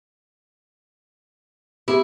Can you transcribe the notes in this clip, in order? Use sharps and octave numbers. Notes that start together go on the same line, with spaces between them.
B3 C4 E4 G4 G#4